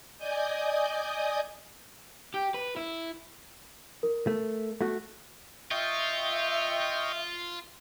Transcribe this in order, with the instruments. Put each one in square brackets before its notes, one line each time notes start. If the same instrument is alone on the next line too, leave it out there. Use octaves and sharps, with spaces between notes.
[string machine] D5 D#5 G#5 D#6 G6
[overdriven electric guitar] G4
B4
E4
[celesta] A#4
[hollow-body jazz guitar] A3
A3 F#4
[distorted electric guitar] F4 [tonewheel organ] D#5 G5 C#6 [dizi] E5